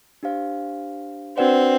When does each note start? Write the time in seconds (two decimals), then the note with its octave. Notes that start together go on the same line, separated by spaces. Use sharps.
0.23 D4 G4 C5 F5
1.38 C4 D4 F#4 B4 D5 F#5